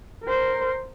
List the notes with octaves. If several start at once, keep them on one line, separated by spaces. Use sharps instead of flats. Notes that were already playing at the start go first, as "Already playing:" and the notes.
A#4 C5